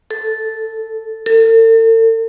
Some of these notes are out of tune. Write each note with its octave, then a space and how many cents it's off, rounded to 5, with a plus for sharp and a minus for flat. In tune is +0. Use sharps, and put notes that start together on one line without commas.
A4 -5
A4 +45